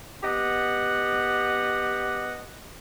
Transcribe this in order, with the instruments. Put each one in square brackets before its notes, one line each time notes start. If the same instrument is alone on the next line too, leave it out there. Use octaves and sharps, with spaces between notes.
[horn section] B3 G4 D#5 F#5